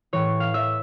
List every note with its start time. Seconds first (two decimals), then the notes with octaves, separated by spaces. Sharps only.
0.13 A2 E3 C#5
0.40 F5
0.54 E5